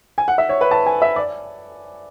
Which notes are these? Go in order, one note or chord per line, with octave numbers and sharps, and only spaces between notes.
G#5
F#5
E5
C#5
B4
A5
G#5
E5
D5